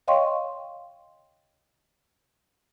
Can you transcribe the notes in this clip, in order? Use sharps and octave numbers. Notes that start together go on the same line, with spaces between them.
C#5 D#5 F5 G5 C6 C#6